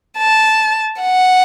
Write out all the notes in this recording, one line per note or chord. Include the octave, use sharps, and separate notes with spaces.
A5
F#5